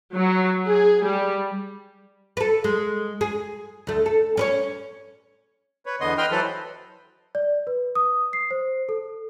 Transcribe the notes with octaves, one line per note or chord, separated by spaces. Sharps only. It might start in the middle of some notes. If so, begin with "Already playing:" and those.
F#3
G#4
G3
A4 B4
G#3
G#4
D2 A3
A4
C#4 B4 C#5
B4 C#5
E2 D3 B3 D#5 C6
B4 D#5 G5 C6 F6
E3 F#3 A4 B4 C5
D5
B4
D#6
C7
C5
A4